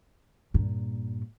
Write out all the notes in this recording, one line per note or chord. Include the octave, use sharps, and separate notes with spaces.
G2 A#2